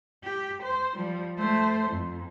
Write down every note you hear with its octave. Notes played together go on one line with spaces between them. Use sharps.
G4
C5
F3 G3
A3 C5
F2